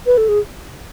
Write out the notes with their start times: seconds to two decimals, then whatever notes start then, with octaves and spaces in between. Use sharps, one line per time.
0.06 B4
0.18 A4
0.28 G#4